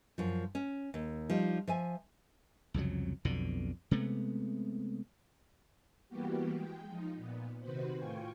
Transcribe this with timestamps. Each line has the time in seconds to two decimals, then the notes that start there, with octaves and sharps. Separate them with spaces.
0.18 F#2 F3
0.55 C#4
0.94 D#2
1.30 F3 G3 D#4
1.67 F3 E5 G#5
2.74 C2 F2 C#3 F#3
3.25 B1 F2 B2 D3
3.91 C3 G#3 A3 B3
6.08 E3 G3 A#3 B3 F#4 G4
6.51 G#3 G5
6.86 F3 D#4
7.16 A#2 B3
7.60 C3 D#3 F#4 B4 C5
7.96 A2 F4 G5 G#5 C#6